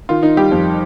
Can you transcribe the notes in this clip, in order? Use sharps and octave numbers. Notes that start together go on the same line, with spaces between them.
D#3 F4
D#3 D#4
G3 G4
F2